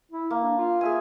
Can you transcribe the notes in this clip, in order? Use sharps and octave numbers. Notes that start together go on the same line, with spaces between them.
E4
A#3
D4
F4
G#4 E5 G#5